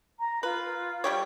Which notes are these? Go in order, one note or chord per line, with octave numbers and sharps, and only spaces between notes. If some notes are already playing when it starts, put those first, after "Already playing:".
A#5
F4 B4
G3 G4 C#5